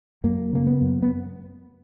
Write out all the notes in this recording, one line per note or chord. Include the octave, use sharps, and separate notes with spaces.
F#2 A#3
C#3 A#3
B3
F#2
B3